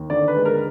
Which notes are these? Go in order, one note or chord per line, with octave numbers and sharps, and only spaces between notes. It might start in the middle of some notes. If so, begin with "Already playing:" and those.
Already playing: D#2
D3 D5
B4
G#3
A#4